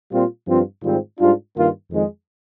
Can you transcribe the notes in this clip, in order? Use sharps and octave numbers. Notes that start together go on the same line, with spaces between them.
A#2 G3 C4 F4
G2 F3 C4 F4
G#2 D#3 G3 C4 F4
G#2 G3 D4 F4
G2 D#3 A#3 F4
F2 D#3 G#3